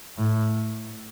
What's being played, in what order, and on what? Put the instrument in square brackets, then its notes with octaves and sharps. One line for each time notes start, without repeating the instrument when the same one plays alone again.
[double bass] A2